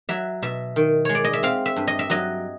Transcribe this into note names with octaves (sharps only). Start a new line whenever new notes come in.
F#3 E5
B2 E5
D#3
G#3 C#5
D5
D#5
E5
C4 F5
E5
G2
D#5
E5
F#3 D#5